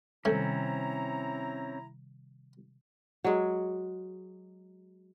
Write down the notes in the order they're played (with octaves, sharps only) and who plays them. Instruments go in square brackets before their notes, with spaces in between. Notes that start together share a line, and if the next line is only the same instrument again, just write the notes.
[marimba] C3 D#3 G3 [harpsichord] A3 [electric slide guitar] C4 C#4 [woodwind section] E4 A#5
[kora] F#3 G#3